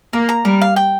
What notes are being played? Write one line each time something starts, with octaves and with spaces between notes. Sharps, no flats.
A#3 A#4
A#5
G3 A#4
F5
G5